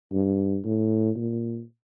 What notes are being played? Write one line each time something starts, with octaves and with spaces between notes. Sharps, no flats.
G2
A2
A#2